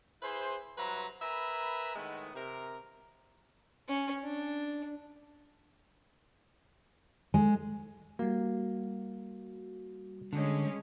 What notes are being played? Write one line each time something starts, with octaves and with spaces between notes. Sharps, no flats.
E4 G#4 B4 C5
G2 F#3 B4 C5 E5 A#5
A#4 B4 E5 G#5 A#5 B5
A2 D#3 G#3 B3
C3 A#4
C#4
D4
G#3
G3 A#3 F#4
D3 G#3 C#4